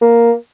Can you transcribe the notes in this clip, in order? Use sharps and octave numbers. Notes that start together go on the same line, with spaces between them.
A#3